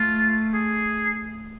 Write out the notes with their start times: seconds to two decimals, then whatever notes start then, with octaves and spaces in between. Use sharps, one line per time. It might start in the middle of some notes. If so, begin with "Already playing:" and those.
Already playing: A3 F4
0.54 G#4